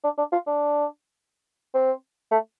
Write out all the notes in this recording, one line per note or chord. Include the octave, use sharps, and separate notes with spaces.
D4
D4
F4
D4
C4
A3